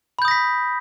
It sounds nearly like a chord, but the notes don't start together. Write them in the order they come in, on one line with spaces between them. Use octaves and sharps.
B5 G6 D#6 A#6 B6